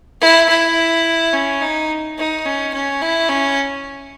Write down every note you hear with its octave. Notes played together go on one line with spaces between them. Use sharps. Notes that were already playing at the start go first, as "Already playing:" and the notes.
E4
E4
C#4
D#4
D#4
C#4
C#4
E4
C#4